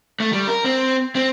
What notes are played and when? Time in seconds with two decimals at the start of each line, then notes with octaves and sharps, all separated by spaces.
0.20 A3
0.33 G3
0.48 A#4
0.64 C4
1.15 C4